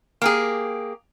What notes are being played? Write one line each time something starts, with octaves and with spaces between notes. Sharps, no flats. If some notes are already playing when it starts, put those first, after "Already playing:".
A#3 G4 G#4